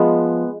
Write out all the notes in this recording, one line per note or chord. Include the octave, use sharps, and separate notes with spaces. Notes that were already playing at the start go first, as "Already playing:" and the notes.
Already playing: F3 G#3 B3